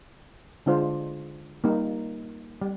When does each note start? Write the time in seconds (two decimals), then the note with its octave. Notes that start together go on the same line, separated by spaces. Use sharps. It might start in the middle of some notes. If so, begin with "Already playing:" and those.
0.66 D3 G#3 D4 F4 C5
1.64 G3 A#3 D#4
2.62 G3